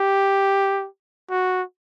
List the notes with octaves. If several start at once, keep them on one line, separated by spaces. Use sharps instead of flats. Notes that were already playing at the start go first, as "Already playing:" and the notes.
Already playing: G4
F#4